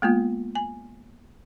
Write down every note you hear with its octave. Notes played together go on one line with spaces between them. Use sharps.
G#3 A#3 B3 F4
G#5